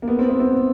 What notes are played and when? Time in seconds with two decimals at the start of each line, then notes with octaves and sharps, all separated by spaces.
0.02 A#3
0.08 B3
0.19 C4
0.29 B3
0.40 C4